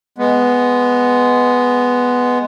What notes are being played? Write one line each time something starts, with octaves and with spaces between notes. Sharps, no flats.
G#3 B3